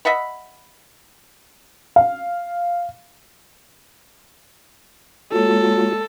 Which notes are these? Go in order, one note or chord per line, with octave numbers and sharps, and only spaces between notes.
D#5 E5 F#5 B5
F5
G#3 A#3 F4 F#4 A4 C#5